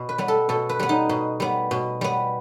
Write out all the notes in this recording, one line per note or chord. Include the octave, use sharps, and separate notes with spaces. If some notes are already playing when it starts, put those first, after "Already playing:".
Already playing: B2
B4
G3 B3
A4
B2 A4
B4
G3 B3
D#4
B2
G3 B3
B2
G3 B3